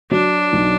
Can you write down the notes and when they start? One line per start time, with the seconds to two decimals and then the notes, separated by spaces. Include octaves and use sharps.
0.11 F#3 D4
0.53 B1